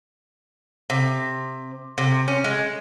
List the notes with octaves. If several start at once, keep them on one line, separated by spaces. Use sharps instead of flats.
C3
C3
C#4
G#3